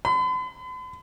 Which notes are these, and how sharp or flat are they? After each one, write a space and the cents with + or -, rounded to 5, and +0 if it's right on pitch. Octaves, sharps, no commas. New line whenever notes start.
B5 +45